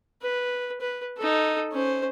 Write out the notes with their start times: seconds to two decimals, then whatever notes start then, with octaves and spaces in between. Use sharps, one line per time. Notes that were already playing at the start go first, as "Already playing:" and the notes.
0.22 B4
0.81 B4
1.18 D#4 A4
1.72 C#4 C5